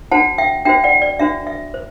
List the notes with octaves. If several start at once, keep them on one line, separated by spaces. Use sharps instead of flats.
D4 F#4 C5 F#5 A5
E5 G5
D4 F#4 C5 E5 G5
D5 F#5
D5
D4 F#4 C5 E5
E5
C5